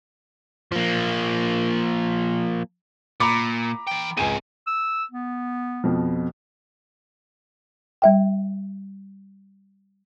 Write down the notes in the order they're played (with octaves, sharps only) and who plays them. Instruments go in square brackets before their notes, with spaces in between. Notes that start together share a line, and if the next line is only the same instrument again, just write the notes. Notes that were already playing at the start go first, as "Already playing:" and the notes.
[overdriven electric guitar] F3 A#3
[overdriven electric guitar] A#2 [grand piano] A#5 B5 D6
[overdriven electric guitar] E3 G5
[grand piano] C#2 G#5 D#7 [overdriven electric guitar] C4 G#4
[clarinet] E6
B3
[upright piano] F2 B2 F3
[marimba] G3 E5 G5